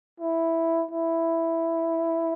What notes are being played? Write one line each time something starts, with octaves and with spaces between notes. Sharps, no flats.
E4
E4